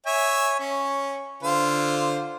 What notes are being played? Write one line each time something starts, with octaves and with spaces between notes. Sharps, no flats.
C#5 E5 G#5
C#4 C#6
D3 F4 C5